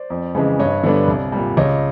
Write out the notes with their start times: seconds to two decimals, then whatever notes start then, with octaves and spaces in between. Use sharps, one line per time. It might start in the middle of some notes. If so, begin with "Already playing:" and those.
Already playing: C5 D5
0.10 F2
0.35 C#3 E3 G#3
0.59 G2 C#5 D#5
0.83 D3 G3 B3 D4
1.08 C2
1.32 A#2 G3
1.57 C#2 C#5 D#5